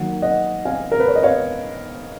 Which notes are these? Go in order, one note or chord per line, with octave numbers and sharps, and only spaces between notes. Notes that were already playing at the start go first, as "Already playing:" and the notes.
Already playing: D#3 F#3 A#3 F#5
D#5 F#5
F5 G#5
A#4
B4
C#5
D#5
C#5 F5